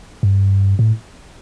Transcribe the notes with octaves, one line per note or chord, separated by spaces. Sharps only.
G2
A2